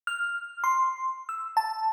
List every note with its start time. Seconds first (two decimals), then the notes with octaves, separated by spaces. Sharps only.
0.07 F6
0.64 C6
1.29 E6
1.57 A5